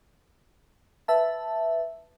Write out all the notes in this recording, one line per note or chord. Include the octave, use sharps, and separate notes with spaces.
B4 E5 A5